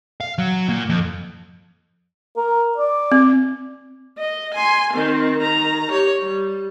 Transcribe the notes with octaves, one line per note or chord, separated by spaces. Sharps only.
F5
F#3
A#2
F2
A#4
D5
C4
D#5
G#5 C6
D#3 C4
D#3 A#5
G4 C#5
G3